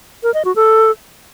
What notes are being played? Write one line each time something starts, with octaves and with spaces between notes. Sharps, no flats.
A#4
D#5
F#4
A4